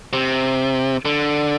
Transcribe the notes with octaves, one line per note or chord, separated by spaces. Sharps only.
C3
D3